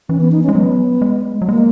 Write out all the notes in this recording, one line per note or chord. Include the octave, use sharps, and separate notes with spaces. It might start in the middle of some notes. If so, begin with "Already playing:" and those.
E3 C#4
B3
D#4
C#4
G#3
F#3 B3
G#3
F#3
G#3 A#3